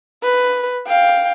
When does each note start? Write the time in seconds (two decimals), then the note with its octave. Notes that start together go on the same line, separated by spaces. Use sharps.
0.23 B4
0.87 F5 G5